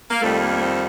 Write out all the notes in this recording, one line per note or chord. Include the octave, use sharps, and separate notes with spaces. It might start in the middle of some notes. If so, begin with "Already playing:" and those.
A#3
F2 D#3 G3 A3
A#3
A#3
C4